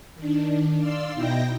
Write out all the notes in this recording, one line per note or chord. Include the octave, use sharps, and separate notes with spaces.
D#3 D4
D5 F5 C6 E6
B2 D#4 E4 G5 G6 A#6